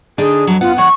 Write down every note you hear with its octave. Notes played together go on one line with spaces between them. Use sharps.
D3 D4 D#4 G#4
F2 F#3
F#2 B3 F4 F#5
E2 C#5 F#5 C#6